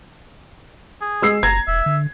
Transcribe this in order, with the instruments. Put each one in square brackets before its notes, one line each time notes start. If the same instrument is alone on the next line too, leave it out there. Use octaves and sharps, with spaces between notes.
[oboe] G#4
[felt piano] G#3 E6 C7
[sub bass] F#1 [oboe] A#5 [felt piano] G#6
[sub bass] E1 [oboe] E5
[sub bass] D3